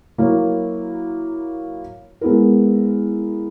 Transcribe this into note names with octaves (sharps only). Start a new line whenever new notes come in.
F#3 A#3 E4 A#4 C#5
G#3 B3 E4 A#4